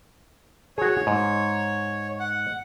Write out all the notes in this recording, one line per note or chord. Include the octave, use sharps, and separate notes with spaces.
F#4 G#4 C#5
G#2
F#5